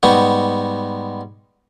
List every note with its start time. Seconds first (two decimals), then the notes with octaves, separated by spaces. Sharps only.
0.03 G#2 G3 B3 D#5 C#6